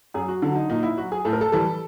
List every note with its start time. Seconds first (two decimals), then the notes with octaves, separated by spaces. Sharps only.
0.14 F#2 G#4
0.28 F#4
0.42 D3 F#3
0.55 D#4
0.69 A#2 D#4
0.83 E4
0.97 F#3 F#4
1.12 G#4
1.25 A2 A4
1.33 A#4
1.41 A4
1.52 E3 G3 A4